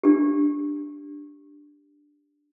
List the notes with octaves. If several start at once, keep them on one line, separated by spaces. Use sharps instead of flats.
D4 G4